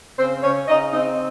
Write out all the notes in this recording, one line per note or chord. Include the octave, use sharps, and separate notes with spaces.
C#3 C4 C5
C#3 C#4 C#5
C#3 D#4 D#5
C4 D#4 D#5